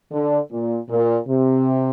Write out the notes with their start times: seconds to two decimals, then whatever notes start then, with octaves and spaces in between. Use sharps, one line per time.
0.12 D3
0.51 A#2
0.90 A#2
1.28 C3